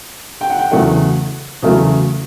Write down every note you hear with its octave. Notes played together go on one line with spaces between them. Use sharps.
G5
F#5
G5
E2 C#3 F#3 A3 F#5
E2 C#3 F#3 A3